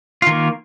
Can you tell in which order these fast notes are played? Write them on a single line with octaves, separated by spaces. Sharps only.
F4 D#3 A#3